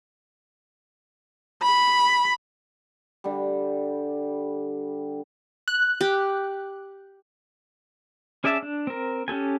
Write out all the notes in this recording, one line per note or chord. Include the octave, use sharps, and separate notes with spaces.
B5
D3 G3
F#6
G4
C#4 G#4 D5 E5 A5
D4
C4 A#4
C#4 G4 A4 G#5